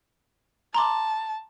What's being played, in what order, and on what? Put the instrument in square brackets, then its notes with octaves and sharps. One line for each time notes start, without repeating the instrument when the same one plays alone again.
[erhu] A5 [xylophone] A#5 C6 D6